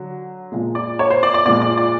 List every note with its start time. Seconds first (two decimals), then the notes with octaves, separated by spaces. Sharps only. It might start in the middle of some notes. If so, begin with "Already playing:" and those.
Already playing: D3 F#3
0.52 A#2 F3 G#3
0.75 D5
0.99 C#5
1.10 C5
1.23 D5
1.34 D5
1.46 A#2 F3 G#3 D5
1.61 D5
1.77 D5